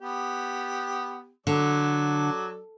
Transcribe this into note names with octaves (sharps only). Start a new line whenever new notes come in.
B3 G4
D3 F#3 A4 D5